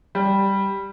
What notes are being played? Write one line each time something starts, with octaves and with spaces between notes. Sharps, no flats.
G3